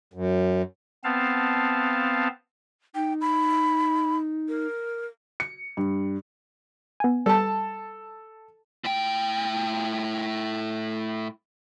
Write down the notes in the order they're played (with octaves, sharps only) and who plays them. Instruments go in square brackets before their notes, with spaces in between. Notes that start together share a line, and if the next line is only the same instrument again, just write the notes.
[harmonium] F#2
[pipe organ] B3 C4 F5 A5
[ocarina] D#4 [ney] G5
[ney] B5
A#4
[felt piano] C#7
G2
[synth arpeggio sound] B3 G#5
[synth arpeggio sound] G3 [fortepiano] A4 A5
[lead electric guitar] A2 G5